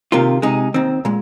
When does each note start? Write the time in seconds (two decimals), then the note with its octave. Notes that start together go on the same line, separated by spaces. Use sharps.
0.12 C3 D#3 A#3 F4
0.42 C3 G#3 D#4 G#4
0.74 D#2 D#3 C4
1.05 A#2 G#3